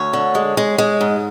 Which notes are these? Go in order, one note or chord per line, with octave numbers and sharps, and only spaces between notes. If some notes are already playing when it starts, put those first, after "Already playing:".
Already playing: D2 C#5
D3
G#3
G#3
G#3
G#2